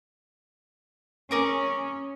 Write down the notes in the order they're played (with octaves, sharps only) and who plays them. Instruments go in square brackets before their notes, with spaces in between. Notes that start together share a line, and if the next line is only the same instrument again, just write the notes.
[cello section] C#4 [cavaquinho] G#4 A#4 D6